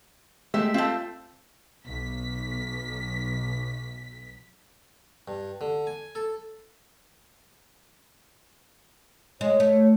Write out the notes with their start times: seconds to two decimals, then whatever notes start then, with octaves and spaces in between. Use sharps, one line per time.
0.54 G#3 A3 G4 E5
0.74 A3 C4 F4
1.86 B1 B6
5.28 G2
5.61 D3
5.87 G#5
6.15 A4
9.41 G#3 C#5
9.60 A3